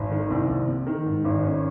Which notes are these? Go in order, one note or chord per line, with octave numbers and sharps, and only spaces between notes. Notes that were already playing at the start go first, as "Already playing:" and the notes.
Already playing: G#1
D#3
C2 C4
C2
C3
D#3
G#2
G#1
D#4
D#3 C#4